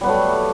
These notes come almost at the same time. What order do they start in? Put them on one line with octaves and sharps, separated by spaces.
G3 B3 F#3 A3